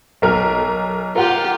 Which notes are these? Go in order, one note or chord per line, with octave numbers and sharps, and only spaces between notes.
B1 A#4 F6
F4 G4 A#4 F#5